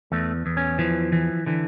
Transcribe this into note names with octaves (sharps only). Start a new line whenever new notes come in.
E2 A3
E2
C#4
E3 F3
E3
D3 E3